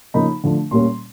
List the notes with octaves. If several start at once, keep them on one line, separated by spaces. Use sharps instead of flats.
C#3 F3 A#3 D#4 B5
D3 F3 A3 D4
A#2 G3 A#3 C#4 C6